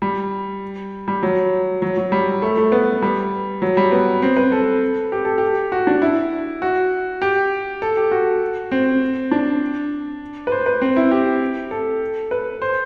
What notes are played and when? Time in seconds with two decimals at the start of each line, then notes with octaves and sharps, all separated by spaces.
0.02 G3
1.08 G3
1.23 F#3
1.82 F#3
1.97 F#3
2.12 G3
2.42 A3
2.57 A3
2.72 B3
3.02 G3
3.62 F#3
3.77 G3
3.92 B3
4.22 C4
4.37 B4
4.52 A4
5.12 G4
5.25 A4
5.38 G4
5.72 F#4
5.87 D4
6.02 E4
6.62 F#4
7.22 G4
7.82 A4
7.97 G4
8.11 F#4
8.71 C4
9.31 D4
10.47 B4
10.52 C5
10.66 B4
10.81 C4
10.96 E4
11.11 G4
11.71 A4
12.31 B4
12.62 C5